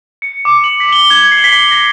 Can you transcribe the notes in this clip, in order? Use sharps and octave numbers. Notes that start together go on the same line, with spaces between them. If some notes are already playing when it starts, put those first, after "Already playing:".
C#7
D6
F#7
B6
G7
G#6
C7
B6
A#6